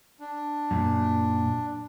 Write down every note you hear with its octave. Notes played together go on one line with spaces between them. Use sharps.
D4
F#2 A#2